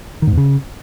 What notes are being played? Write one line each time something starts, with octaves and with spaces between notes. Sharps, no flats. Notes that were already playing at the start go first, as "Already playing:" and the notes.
D#3
G#2
E2
C#3